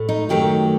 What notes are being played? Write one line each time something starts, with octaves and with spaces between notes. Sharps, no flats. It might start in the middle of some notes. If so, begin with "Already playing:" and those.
Already playing: A2 A3
D#4
F#2 D#3 F#3 A3 G4